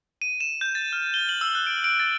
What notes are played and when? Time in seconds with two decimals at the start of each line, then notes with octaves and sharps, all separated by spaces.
0.22 D#7
0.41 E7
0.61 G6
0.75 A6
0.93 F6
1.14 G7
1.29 F#7
1.41 E6
1.55 F#6
1.67 D7
1.84 D7
1.99 A6